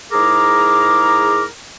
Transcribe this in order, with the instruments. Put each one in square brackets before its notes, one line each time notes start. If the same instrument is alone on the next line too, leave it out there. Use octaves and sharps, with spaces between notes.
[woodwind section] G#2 E4 G#4 A#4 A#5 D6